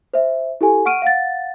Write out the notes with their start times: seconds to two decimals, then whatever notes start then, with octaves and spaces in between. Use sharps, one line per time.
0.14 C5 E5
0.61 E4 G4 A4 G#5
0.86 F#5 C#6 F6 D7 D#7
1.02 F5 F#5 A6